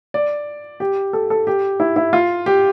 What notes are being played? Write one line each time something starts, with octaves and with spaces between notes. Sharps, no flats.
D5
G4
A4
A4
G4
E4
E4
F4
G4